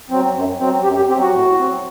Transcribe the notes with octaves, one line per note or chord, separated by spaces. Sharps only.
F#3 C4
F#2
F#3 C4
F#2 G4
G4
F#3 C4 G4
F#4
A2
F#3 C4